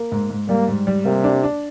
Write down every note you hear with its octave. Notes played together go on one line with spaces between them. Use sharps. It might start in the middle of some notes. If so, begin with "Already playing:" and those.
Already playing: A#3
G#2
G#2
G3 A#3
G#2
G3
C3 A#3
D4
D4